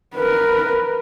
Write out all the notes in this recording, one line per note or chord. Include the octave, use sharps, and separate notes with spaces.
A#4 B4